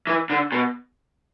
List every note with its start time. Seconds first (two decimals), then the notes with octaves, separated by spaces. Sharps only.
0.07 E3
0.30 D3
0.52 B2